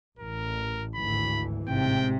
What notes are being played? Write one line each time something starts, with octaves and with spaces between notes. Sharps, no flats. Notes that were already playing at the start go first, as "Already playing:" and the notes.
A1 A#4
G#1 D2 E3 B5
A1 G#2 C3 G5